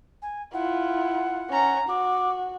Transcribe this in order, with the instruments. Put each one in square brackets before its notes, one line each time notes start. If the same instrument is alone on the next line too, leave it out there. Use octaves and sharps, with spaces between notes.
[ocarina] G#5
[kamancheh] E4 F4 [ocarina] F#5
[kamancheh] C#4 A#5
[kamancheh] F#4 [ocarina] D6